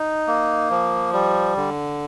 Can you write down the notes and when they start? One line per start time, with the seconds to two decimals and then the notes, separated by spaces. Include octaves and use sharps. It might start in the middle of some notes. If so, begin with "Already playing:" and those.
Already playing: D#4
0.27 A#3
0.71 F3
1.13 G3
1.56 D3